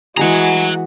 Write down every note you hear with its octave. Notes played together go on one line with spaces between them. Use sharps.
E3 G#3 F#4 G#4 F#5 A#5